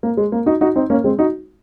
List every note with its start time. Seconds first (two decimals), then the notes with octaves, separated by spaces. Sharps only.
0.03 A#3
0.17 G#3
0.32 A#3
0.46 D#4 F#4
0.61 D#4 F#4
0.76 C4 D#4
0.90 A#3 C#4
1.04 G#3 C4
1.19 D#4 F#4